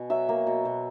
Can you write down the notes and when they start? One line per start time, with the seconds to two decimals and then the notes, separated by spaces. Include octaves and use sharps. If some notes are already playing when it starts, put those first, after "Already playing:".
Already playing: B2 G#5
0.10 F#3 E5
0.29 A#3
0.47 B2
0.65 B2